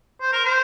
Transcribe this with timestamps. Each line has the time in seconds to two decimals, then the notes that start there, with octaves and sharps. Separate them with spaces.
0.21 C5
0.32 A#4
0.45 C5